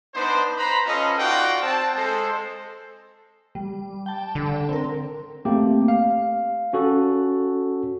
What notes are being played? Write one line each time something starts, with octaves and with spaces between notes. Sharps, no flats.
B3 D4 D#4 B4 C5
B4 C5 A#5 B5
C#4 F4 A4 B4 D#5
D#4 F4 F#4 D5 F#5 G5
C4 A5
G#3 A4 C5
G3
G5 A5
D3
C4 A#4
A3 A#3 C4 G4
F5
C#4 F#4 A4